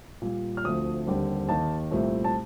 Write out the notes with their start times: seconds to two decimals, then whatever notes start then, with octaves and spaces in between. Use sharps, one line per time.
0.22 A#2 G3 A#3
0.57 F6
0.64 D2 D3 F3 A3 C4 D#6
1.07 D#2 D3 G3 C4
1.49 D#2 D#3 A#3 A5
1.91 C2 A#2 A3 C4
2.24 A5